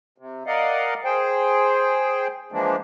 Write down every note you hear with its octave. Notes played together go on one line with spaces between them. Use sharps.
C3
A#4 D5 D#5 F5 F#5
G#4 C5 G5
E3 F3 G#3 A#3 D4